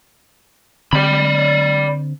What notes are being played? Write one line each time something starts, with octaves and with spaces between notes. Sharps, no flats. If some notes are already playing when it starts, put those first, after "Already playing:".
D3 C4 D5 B5